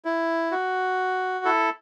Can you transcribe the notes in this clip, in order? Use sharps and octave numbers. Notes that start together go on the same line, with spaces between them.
E4
F#4
E4 A4